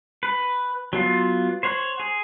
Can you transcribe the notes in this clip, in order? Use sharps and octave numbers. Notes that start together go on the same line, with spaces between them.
B4
F#3 B3 F4
C5 C#5 F#5
G#4